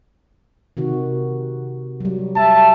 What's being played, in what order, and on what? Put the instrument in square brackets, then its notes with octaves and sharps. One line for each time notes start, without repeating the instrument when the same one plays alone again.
[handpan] C3 D#3 F#4
F#3 G3
[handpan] G3 [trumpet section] E5 A5